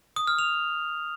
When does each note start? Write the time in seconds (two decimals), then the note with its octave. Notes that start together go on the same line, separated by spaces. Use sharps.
0.16 D#6
0.27 F6
0.39 F7